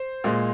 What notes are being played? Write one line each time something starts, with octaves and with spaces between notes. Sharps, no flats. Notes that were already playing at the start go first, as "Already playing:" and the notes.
Already playing: C5
A#2 G#3